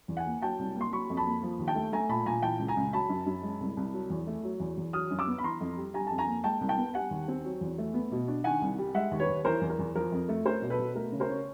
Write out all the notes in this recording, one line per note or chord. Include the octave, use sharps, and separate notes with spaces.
E2
F#5 G#5
A#3
F#3 G5 A5
C2
A#3
C6
F#3 B5 C#6
F2
A5 B5
A#3
F3
D#2
G5 A5
A3
A3 G#5 A#5
A#2 A5 B5
A#2 G#5 A#5
E3 G5 A5
C#2
G#5 A#5
C#2
F#3 A5 B5
F#2
F#2
G#3
C2
C2
F#3
E2
A3
F#3
E2
E2
F#3 D#6 F6
F#2
D6 E6
B3
B5
E3 A#5 C6
F2
G3
G3 G#5 A#5
F2 A5
G#5 A#5
A#3
G#3 G5 A5
C2
G5 A5
B3
G3 F#5 G#5
D#2
C4
F#3
E2
A3
B3
B2
D4
D#3 F#5 G#5
C2
G3
G#3 E5 F#5
D#2
B4 C#5
D#2
E3 A#4 C5
E2
A#4
E2
F3 A#4
F2
A3
C#4 A#4 C5
B2
A4 B4
B2
A3 A#4
C#3
A#4 C5
C#4